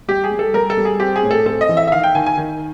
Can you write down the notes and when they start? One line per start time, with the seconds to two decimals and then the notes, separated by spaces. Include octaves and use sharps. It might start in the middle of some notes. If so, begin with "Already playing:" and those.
0.08 G3 G4
0.24 G#4
0.31 G3
0.39 A4
0.54 G3 A#4
0.70 A4
0.77 G3
0.85 G#4
1.00 C4 G4
1.16 G#4
1.23 A2
1.31 A4
1.46 C4 A4
1.61 D#5
1.69 E3
1.77 E5
1.87 E5
1.92 D#3 F5
2.04 G5
2.15 D#3 G#5
2.26 G#5
2.37 D#3